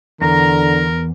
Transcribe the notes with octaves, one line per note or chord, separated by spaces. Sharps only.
E2 D3 A#4 A#5